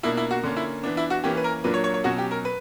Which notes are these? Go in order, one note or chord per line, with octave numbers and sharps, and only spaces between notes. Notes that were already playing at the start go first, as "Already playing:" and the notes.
B2 A#3 D4 E4
E4
F#4
D3 A#3 C#4
E4
E3 B3 D4
E4
F#4
E3 A#3 C#4 G4
B4
A#4
A#2 F#3 A#3 D4 B4
C#5
C#5
C#5
B2 F#3 C#4 F#4
G4
A#4
B4